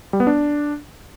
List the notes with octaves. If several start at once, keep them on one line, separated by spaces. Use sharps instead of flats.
G3
B3
D4